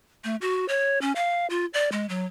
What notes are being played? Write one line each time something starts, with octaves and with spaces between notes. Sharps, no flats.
A3
F#4
C#5
C#4
F5
F4
D5
G#3
F#3